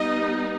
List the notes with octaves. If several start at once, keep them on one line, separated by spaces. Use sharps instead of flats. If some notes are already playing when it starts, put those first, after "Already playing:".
Already playing: G3 B3 D#4 D#5